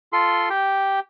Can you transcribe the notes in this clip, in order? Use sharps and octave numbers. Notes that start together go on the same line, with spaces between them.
F4 A4 C6
G4 G5